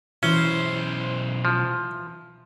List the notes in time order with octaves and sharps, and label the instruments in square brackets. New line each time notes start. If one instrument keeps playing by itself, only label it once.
[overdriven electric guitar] B1 C5 [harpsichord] E3 [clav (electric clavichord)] C#4
[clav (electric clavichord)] F3